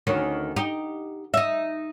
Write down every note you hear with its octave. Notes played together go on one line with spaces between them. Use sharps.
D2 D#3 C#4
D#4 G4
D#4 E5